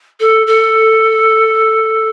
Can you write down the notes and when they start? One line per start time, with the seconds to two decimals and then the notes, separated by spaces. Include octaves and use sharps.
0.20 A4
0.47 A4